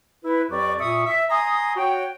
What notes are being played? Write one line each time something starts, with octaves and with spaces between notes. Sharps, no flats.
E4 B4
F2 F#3 G4 B4 D5 C#6
A#2 E5 C#6 D#6
E5
G#5 A#5 C6 D#6
F#4 C#5 G5